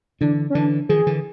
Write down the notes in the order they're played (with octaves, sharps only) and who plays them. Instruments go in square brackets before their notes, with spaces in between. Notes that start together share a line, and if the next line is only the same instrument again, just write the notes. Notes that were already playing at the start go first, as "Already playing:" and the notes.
[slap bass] D3 E3 [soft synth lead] D4
[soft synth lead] C#4
[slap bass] D3 E3 [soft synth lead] D4
[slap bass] D#3 F3 [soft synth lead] G#4
[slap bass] D3 E3